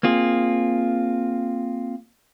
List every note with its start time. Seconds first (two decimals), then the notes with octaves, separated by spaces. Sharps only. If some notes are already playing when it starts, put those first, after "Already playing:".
0.03 A#3 C4 F4 G#4